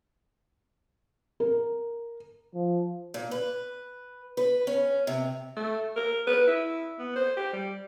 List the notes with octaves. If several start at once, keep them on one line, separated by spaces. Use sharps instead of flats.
A#4
F3
A#2
B4
B4
C#4
C3
A3
A#4
B4
E4
B3
C5
G4
G3